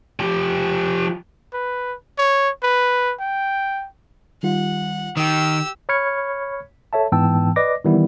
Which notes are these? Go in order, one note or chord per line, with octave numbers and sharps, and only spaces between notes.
F3 G4
B4
C#5
B4
G5
D#3 G3 F4 F#5
D#3 G4 D#6 E6
C#5 B5 C#6 F6 G#6 C#7
A4 C#5 E5 A5
G#2 E3 B3 G5 A5 E6
B4 D5 D#5 D6 A#6
D#3 E3 G3 B3 E4